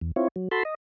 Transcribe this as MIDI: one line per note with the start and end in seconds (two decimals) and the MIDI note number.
0.01 0.12 40
0.16 0.28 60
0.16 0.28 64
0.16 0.28 65
0.16 0.28 73
0.36 0.48 54
0.51 0.63 66
0.51 0.63 69
0.51 0.63 81
0.51 0.63 83
0.51 0.63 84
0.65 0.75 75